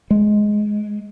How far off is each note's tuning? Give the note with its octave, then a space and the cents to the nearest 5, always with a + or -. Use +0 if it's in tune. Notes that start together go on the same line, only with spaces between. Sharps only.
G#3 +10